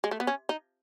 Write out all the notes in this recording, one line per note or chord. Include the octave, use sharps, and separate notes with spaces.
G#3
A3
B3
C#4
D#4